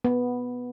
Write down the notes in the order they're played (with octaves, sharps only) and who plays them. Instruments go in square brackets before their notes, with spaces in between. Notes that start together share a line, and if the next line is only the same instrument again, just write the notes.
[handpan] B3